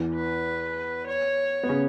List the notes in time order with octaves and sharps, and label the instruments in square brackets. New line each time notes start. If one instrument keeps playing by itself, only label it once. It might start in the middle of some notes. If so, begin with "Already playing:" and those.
Already playing: [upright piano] E2 E3
[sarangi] B4
C#5
[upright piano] B3
C#3 C#4